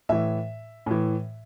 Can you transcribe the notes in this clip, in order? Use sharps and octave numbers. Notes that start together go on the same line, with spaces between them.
A2 E3 E5
A2 E3